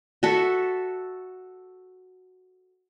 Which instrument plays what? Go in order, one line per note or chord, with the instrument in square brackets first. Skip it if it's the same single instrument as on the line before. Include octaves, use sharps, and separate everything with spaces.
[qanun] F#4 A4 E5